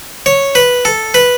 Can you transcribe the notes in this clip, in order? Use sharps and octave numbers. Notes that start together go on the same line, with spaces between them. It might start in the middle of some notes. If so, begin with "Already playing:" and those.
C#5
B4
A4
B4